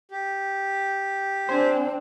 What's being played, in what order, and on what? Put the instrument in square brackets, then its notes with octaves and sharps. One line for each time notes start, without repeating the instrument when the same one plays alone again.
[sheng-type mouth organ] G4
[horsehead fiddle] C4 D4 [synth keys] C5 G#5